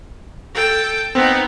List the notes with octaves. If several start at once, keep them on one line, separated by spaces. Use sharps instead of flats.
A4 G5
B3 C4 D#4